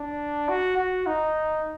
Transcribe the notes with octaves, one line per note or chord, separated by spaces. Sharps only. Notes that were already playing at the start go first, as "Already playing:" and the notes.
Already playing: D4
F#4
F#4
D#4